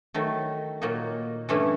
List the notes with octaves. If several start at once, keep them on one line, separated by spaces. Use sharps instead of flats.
D#3 F#3 A3
A#2 F#3 A#3 D#4
G2 E3 A3 C#4 E4